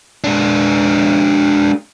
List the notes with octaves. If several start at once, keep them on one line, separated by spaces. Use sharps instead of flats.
G#3 D4